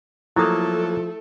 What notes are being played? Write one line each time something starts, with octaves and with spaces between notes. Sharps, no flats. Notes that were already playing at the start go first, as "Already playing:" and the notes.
F3 F#3 A3 A#3 E4 A4 D#6